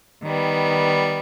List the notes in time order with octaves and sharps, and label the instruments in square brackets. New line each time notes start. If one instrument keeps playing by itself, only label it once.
[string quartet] D#3 G3 B3